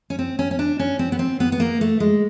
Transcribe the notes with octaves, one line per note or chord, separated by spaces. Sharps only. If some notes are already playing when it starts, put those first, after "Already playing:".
C#4
C4
C#4
C#4
D4
C#4
C4
B3
C4
B3
B3
A#3
A3
G#3